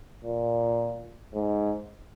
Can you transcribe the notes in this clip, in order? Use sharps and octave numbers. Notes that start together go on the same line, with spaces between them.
A#2
G#2